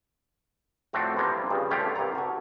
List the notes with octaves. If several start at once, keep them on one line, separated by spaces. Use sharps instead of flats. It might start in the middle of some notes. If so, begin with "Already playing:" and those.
A2 F3 A3 C4 D4 F#4
E3 F3 G3 A#3 D4 F4
G2 C#3 F3
D3 A3 F4 G4 C#5 F5
C2 G2 D5 A#5
F#4 A4 G#5